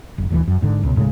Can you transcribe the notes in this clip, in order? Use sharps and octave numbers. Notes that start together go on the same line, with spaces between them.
F#1
D#1 D2 E3
F#2
G#1 G#2 D3
C#2 B2
D#1 A2 C#3 G#3